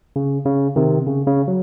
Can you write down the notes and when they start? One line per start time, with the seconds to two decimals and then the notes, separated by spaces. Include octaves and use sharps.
0.16 C#3
0.45 C#3
0.76 C3 D#3
1.07 C#3
1.27 C#3
1.48 F#3